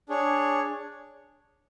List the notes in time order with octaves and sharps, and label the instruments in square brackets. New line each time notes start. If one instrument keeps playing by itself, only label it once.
[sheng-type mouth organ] D4 G#4 C#5